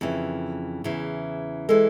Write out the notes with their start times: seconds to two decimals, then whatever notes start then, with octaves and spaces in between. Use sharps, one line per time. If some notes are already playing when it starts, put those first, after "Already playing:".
0.01 F2 C#3 E3
0.84 E2 C#3 E3
1.69 E3 G#3 A4